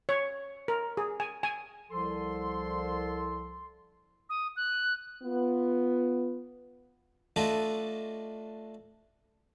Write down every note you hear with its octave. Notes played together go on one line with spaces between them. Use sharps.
C#5
A#4
G#4
G#5
G#5
C2 F3 A4 C6
D#6
F#6
B3 F4
A3 D4 F4 F#4 A4 D#5